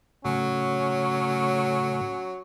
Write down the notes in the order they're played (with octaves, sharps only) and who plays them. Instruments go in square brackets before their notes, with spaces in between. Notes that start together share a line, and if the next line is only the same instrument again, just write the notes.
[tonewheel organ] A2 C#3 A3 [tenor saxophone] F#3 [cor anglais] C#4